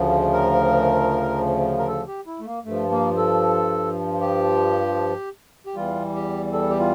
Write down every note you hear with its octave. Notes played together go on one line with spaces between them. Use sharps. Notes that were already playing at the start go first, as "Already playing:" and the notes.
Already playing: D2 C#3 F3
A#4
A#4
A4
G4
E4
A3
A#3
G2 F3 A3
A#3
A4
G4
G4
E2 E3 G3 F4
G4
A4
G4
F4